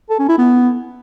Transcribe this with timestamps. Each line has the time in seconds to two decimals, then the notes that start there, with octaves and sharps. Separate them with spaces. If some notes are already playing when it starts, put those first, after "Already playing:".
0.10 A4
0.19 C#4
0.29 E4
0.38 B3